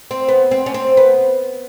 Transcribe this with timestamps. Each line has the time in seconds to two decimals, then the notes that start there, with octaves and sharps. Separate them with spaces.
0.11 C4
0.28 B3
0.51 C4
0.66 C#4
0.74 C4
0.97 B3